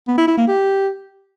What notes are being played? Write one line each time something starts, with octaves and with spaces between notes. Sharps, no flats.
B3
E4
E4
A#3
G4